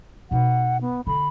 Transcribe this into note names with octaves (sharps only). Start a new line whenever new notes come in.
B2 D#4 F#5
B3
D3 B5